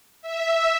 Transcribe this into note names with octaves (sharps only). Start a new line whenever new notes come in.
E5